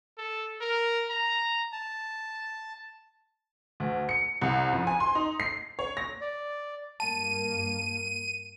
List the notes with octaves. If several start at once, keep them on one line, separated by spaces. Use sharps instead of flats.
A4
A#4
A#5
A5
D2
C#7
C2
F2
G#5
C6
D#4
C7
C#5
A#6
D5
G2 A#3 A5 D#7